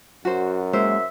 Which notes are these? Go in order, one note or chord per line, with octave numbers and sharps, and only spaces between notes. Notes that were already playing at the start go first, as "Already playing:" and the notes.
F#2 F#4 C5
G#3 A#3 C5 E5